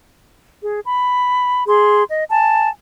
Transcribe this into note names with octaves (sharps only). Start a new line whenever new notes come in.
G#4
B5
G#4 C6
D#5
G#5 A5